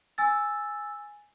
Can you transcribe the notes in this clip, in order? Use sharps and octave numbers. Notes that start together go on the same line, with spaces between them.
G#5 E6 A6